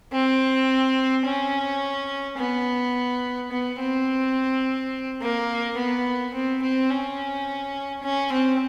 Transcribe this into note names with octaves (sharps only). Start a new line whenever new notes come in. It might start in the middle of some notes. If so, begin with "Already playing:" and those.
C4
C#4
B3
B3
C4
A#3
B3
C4
C4
C#4
C#4
C4